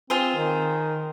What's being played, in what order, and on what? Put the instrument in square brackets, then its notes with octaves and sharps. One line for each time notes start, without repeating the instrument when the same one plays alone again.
[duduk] C4 [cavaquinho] F4 G#4 C5
[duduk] D#3